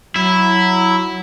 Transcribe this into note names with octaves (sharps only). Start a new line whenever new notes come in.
F#3 E4